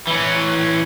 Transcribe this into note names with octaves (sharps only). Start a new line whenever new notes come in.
E3 C#4